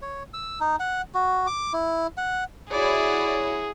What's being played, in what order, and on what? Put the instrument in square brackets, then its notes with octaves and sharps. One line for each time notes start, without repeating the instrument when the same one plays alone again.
[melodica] C#5
E6
D#4
F#5
F#4
D6
E4
F#5
[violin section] E4 F#4 C#5 [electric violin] G#4 [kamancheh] D5